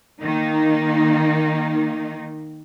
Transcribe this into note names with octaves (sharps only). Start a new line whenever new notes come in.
D#3 A#3 D#4